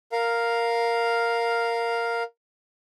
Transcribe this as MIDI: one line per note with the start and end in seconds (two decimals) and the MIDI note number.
0.12 2.23 70
0.12 2.23 77